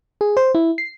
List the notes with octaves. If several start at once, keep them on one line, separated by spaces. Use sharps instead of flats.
G#4
C5
E4
C7